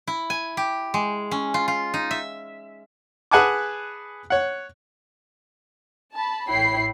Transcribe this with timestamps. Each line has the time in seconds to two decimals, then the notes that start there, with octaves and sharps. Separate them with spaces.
0.07 E4
0.30 G#5
0.57 G4
0.94 G#3
1.31 C#4
1.54 F4
1.68 F4
1.94 D#4
2.11 E5
3.31 G#4 B4 F#5 G#5 A5 D6
4.30 C#5 F#5
6.13 A5 B5
6.48 A1 E4 C#5 G5 B5 C7